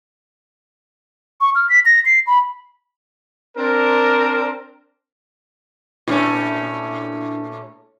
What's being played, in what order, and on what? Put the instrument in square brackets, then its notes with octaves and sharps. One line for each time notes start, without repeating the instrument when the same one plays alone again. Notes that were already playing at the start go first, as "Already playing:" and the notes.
[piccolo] C#6
F6
B6
A#6
C7
B5
[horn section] C4 D4 A#4
[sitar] A#2 A3 C#4 [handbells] D4 E4